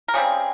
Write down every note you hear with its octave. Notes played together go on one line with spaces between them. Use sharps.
A#4
C#3 G3 C4 G#4